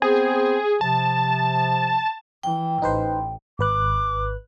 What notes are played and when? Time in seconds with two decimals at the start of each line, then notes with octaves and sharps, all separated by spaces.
0.02 B3 C4 G#4 C5
0.81 C3 F3 A5
2.43 E3 G5
2.82 A1 D#4 B4 C5
3.59 G#1 B4 D6 F#6